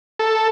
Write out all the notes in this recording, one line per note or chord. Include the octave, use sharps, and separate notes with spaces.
A4